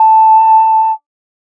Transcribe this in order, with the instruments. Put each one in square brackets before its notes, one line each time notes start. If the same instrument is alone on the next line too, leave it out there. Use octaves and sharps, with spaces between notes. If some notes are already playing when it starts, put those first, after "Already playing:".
Already playing: [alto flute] A5